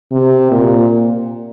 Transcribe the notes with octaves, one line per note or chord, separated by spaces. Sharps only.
C3
A#2